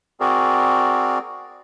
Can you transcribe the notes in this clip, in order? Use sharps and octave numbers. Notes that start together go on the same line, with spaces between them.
C4 F#4 G#4 A#4 D5